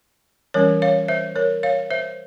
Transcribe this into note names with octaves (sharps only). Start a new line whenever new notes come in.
E3 G3 C#4 A#4 C#5
C#5 F5
C5 E5
A#4 C#5
C#5 F5
C5 E5